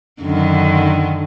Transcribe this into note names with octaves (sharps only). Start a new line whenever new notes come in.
F#2 D3 D#3